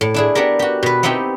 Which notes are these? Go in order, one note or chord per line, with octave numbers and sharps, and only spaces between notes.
A2
D4 E4 G#4
B3 D4 G4 A#4
F#4 G4
B2 B4
B3 C4 D#4 E4 G4